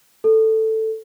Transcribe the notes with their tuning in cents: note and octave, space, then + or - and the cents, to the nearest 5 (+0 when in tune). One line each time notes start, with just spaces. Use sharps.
A4 +5